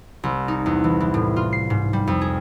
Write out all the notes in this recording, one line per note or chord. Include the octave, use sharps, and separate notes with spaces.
C2
D#4
E2
E3
E3
A2
F4
C7
G#2
G3
F2
G#4